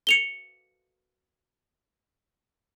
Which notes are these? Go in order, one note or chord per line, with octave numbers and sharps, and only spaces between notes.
C#7 F7 G7